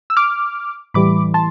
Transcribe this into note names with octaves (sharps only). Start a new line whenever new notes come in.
E6
D6 F6
A2 E3 G3 B5 D6
A5 C6